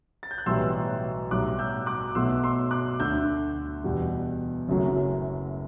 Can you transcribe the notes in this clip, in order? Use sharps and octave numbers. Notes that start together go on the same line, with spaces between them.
A6
G6
F#6
B1 A2 E3 G3 C6 E6
B1 A2 G3 D6 F#6
E6 G6
D6 F#6
B1 B2 A3 C6 E6
C6 E6
D6 F#6
D2 D3 A3 E6 G6
E2 B2 G3
F#1 F#2 F#3 A3